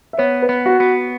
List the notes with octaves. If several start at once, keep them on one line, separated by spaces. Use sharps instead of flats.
E5
B3 C#5
B4
B3
F#4
B3